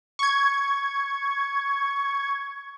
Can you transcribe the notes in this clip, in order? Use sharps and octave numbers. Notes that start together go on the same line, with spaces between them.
C#6 G#6